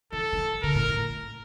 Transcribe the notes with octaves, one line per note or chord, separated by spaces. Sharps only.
E3 A4
E3
D#3
D3 A#4
A2
A2